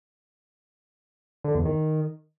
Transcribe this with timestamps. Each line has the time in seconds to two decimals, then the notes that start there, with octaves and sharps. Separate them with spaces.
1.44 D3
1.55 E2
1.65 D#3